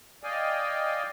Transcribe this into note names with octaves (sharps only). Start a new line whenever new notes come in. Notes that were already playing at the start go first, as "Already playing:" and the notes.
D5 D#5 F5 G5 G#5